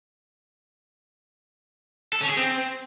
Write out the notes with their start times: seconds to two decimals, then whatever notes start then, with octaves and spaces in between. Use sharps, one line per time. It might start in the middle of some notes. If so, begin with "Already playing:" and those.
2.13 A4
2.21 C#4
2.29 G#4
2.37 C4